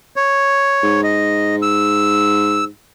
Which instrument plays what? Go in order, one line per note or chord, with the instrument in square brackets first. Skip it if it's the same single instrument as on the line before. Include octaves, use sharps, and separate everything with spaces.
[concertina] C#5
[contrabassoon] G#2
[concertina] D#5
E6